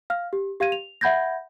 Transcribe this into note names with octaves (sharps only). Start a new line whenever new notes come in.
F5 F6
G4
G4 F5 G#6 D#7
F7
E5 F#5 B5 G6 G#6 A#6